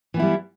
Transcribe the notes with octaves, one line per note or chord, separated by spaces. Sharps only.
E3 G3 B3 E4